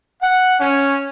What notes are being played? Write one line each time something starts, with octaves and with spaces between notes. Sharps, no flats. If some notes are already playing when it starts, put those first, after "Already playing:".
F#5
C#4